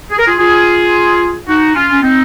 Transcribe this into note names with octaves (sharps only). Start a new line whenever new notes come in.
G#4
A#4
F4 G#4
F4 G#4
D#4 F#4
C#4 F4
C#4
C4 D#4